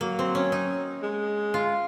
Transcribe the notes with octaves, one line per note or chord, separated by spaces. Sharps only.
F#3 A#3
C4
C#4
D#4
G#3
F4